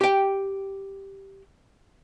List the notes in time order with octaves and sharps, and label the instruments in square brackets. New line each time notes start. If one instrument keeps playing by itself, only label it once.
[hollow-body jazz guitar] G4 G5